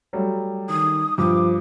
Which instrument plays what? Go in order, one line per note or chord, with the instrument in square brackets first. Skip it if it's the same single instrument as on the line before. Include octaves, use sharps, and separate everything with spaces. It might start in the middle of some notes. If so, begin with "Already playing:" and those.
[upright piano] F#3 G3 A3
[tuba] D#3 [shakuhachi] D#6
[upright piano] G2 D#6 [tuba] F3 [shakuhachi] D6